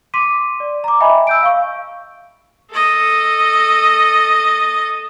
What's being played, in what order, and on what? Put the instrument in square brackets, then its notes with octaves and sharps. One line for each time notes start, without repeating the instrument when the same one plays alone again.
[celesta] C6 D6 B6 D#7
D5
A#5 D6
D#5 E5 G5 G#5 B5
E6 G6 D7
F5 C#6
[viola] A4 D#5